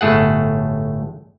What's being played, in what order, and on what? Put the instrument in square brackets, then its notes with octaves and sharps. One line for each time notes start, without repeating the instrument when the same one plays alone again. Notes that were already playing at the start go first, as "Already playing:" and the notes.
[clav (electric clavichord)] G1 A2 A3 G#4 F#5